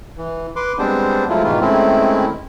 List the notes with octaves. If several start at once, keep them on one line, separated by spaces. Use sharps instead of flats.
E3
B4 C6 D6
G3 G#3 B3 C4 D4 C5
F3 F#3 G#3 A3 E4 F4
G#2 B2 D#3 E3 F4
D#3 G#3 A3 C4 C#4 E4